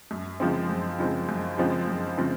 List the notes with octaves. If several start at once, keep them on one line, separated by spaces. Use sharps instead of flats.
F#2
C#3 F3 G#3 C4
F#2
C#3 F3 G#3 C4
F#2
C#3 F3 G#3 C4
F#2
C#3 F3 G#3 C4